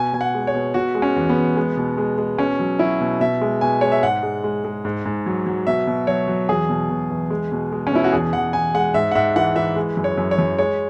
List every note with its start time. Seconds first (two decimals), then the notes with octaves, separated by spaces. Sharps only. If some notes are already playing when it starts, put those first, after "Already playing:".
Already playing: B2 G#5
0.13 B2 G#5
0.21 F#5
0.34 G#3
0.47 C#5
0.54 B2
0.74 B2 F#4
0.95 G#3
1.02 C#4
1.16 E2
1.29 B3
1.36 E2
1.56 G#3
1.77 B2
1.98 G#3
2.18 G#3
2.38 B2 C#4
2.60 F#3
2.79 F#3 E4
3.01 B2
3.20 B2 E5
3.41 G#3
3.61 B2 G#5
3.81 G#3 C#5
3.92 E5
4.02 G#2 F#5
4.23 G#3
4.44 G#3
4.64 G#3
4.85 G#2
5.05 G#2
5.26 F#3
5.47 F#3
5.67 B2 E5
5.87 B2
6.07 F#3 C#5
6.28 F#3
6.49 E2 G#4
6.69 B2
6.90 B2
7.10 E2
7.30 G#3
7.52 B2
7.72 G#3
7.87 C#4
7.92 B2 E4
8.04 F#4
8.13 E2 G#4
8.33 E2 F#5
8.53 E2 G#5
8.74 G#3 F#5
8.94 G#2 E5
9.11 F#5
9.15 G#2 E5
9.36 E3 F#5
9.55 E3 E5
9.76 G#3
9.97 F#2
10.04 C#5
10.18 F#2
10.31 C#5
10.38 F#2
10.58 G#3 C#5